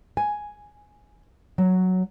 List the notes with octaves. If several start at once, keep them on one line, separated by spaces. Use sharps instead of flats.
G#5
F#3